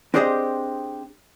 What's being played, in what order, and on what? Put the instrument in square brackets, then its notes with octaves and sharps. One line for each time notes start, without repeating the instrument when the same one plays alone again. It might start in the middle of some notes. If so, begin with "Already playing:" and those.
[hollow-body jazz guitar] C4 D4 G4 G#4 C5 D#5